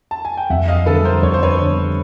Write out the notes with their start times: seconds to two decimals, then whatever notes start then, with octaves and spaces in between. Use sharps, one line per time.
0.11 A5
0.25 G#5
0.37 G5
0.50 F2 E5 F#5
0.68 D#5 F5
0.86 D3 G3 B3 A4 B4
1.04 A#4 C5
1.23 F2 C#5
1.34 C5
1.43 B4 C#5
1.60 D3 G3 B3